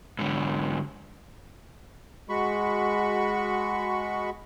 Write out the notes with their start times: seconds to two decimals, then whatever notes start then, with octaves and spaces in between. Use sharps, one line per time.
0.19 G#2 D3
2.29 G#3 F#4 B5 C#6